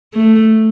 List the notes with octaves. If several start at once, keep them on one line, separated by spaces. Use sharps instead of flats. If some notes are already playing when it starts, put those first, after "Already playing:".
A3